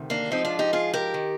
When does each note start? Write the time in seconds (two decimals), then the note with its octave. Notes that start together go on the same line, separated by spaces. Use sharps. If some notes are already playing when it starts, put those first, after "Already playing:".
Already playing: D2 C3 D#3
0.10 A#3 D4
0.31 G#2 F3 C4 D#4
0.45 D4 F4
0.59 D#4 G4
0.73 F4 G#4
0.93 G4 A#4
1.14 D#3